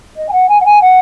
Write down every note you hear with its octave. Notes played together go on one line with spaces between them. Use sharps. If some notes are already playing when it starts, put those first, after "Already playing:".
D#5
G#5
F#5
G#5
F#5
G#5
F#5